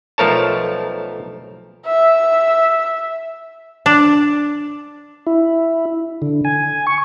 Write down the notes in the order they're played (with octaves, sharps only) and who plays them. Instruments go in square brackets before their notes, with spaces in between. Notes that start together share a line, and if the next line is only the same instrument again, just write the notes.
[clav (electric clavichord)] B1 F3 A3 A#4 C#5 A5
[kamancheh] E5
[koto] D4
[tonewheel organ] E4
D3
G#5
C#6